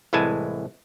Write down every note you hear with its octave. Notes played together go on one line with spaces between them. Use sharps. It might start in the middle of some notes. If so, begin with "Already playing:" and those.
C2 A2 E3 G#3 G#5 A5